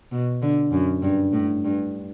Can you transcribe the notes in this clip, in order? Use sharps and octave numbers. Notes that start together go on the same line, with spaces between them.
B2
D3
F#2
G2
A2
G2